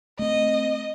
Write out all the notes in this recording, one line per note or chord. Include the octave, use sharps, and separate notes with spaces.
A3 C4 D#5